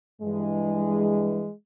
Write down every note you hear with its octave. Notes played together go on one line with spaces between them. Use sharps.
G2 E3 G#3